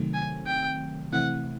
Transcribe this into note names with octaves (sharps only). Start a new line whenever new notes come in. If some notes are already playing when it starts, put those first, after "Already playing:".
Already playing: C3 D#3 F#3 A3 C4
G#5
G5
C3 E3 A3 C4 E4 F#5